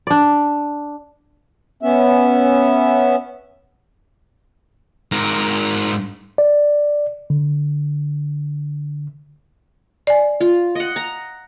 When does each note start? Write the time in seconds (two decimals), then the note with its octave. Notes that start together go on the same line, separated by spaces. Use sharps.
0.07 D4 D5
1.83 B3 C#4 E5
5.12 G#2 A#4
6.38 D5
7.30 D3
10.07 D5 G#5
10.40 F4
10.75 D#5 F#5
10.96 A#5